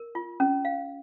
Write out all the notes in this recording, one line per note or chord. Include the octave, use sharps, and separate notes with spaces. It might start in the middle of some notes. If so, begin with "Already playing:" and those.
Already playing: A#4
F4
C#4
F5